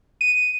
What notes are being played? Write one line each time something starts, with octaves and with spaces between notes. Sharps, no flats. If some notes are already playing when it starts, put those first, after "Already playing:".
D#7